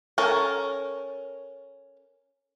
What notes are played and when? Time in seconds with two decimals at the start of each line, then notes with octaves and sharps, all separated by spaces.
0.18 C#4 A4 A#4